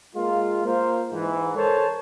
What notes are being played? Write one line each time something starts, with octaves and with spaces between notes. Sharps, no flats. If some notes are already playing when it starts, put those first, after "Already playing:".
G#3 A#3 F4
A#3 F4 A#4 C5
G#2 E3
A4 A#4 C5 C#5 A5